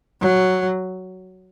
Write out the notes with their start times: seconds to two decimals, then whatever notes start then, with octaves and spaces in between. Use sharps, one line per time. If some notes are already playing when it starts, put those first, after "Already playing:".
0.21 F#3